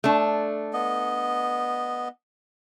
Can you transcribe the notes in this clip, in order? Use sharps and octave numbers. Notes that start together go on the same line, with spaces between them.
A3 D4
B3 D#5